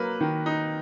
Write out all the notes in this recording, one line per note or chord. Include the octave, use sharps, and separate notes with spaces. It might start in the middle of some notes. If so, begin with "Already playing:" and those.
Already playing: F#3 A#3 B4
D#3
D#4